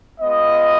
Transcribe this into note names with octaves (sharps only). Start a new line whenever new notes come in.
G#3 B3 F4 D#5